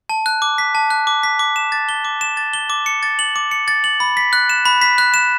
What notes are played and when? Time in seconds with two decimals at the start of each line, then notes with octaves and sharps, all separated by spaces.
0.09 A5
0.26 F#6
0.42 D6
0.58 B6
0.75 A5
0.90 F#6
1.07 D6
1.23 B6
1.39 D6
1.56 E7
1.72 A6
1.89 G7
2.05 D6
2.21 E7
2.37 A6
2.53 G7
2.70 D6
2.86 C#7
3.03 A6
3.19 F#7
3.36 D6
3.51 C#7
3.68 A6
3.84 F#7
4.00 B5
4.17 B6
4.33 F#6
4.50 E7
4.65 B5
4.81 B6
4.98 F#6
5.14 E7